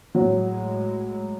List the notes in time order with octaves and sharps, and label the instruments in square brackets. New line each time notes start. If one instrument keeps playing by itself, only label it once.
[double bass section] A2 G#3 [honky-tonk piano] F#3